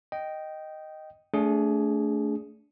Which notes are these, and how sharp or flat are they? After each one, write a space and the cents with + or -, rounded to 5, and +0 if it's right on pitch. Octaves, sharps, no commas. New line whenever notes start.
D#5 +0 G5 -10
A3 +0 D4 -30 G#4 +0